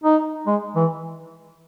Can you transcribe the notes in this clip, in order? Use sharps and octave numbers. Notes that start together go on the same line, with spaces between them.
D#4
G#3
E3